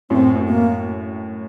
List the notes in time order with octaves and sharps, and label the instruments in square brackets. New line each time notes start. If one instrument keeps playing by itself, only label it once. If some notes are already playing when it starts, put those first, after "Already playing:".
[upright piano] F#2 A2 [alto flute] C4
[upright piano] F#2 A2
[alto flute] A#3